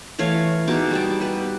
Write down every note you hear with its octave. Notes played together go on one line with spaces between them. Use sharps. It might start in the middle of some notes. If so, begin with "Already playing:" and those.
E3 A3 C#5 F5
B2 D#4 G#4 D6
G3 G5 A5
G4 B4